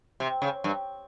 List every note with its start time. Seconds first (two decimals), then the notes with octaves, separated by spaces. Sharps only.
0.20 C3
0.42 C#3
0.64 G2